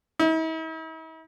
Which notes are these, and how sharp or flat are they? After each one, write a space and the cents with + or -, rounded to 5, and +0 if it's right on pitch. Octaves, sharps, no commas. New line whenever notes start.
E4 -45